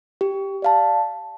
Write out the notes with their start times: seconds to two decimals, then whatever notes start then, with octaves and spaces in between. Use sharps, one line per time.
0.21 G4
0.62 D5 F5 A5